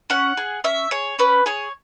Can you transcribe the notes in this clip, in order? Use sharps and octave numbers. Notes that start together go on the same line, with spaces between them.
C#4 F#5
G#4
C#4 E5
G#4 C#5
C#4 B4
G#4 C#5